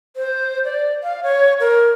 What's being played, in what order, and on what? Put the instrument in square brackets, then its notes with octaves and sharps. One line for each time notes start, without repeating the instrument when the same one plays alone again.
[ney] C5
D5
F5
C#5
A#4